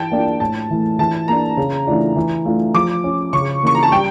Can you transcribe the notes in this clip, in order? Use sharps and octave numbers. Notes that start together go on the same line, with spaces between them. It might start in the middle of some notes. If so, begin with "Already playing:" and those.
Already playing: E3 G5 A5
A#3 D4 F4
A2 A5
E3 A3
E3 A5
A#3 D4 A#5
C#3
E3 A3 D4 F4
E3
A3 D4 F4
F3 D6
C#4 F4
C#3 C#6
E3 A#3 C#4 C#6
A#5
A5
G3 G5